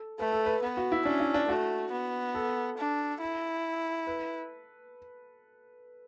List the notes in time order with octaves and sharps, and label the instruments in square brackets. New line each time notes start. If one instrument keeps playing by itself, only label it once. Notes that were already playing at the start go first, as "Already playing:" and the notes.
Already playing: [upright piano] A4
[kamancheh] A3 [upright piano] B4
[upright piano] A4
B4
[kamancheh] B3
[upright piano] F#4
E4
[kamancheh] C#4 [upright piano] D4
[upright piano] E4
D4
[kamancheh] A3 [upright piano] F#4
[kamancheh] B3
[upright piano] A4
[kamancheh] D4
E4
[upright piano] B4